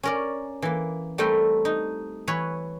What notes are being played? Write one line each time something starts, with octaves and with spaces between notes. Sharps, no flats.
C#4 A#4 D5
E3 A#3
G3 A3 C4 A#4 G5
D#4
E3 B4 C#5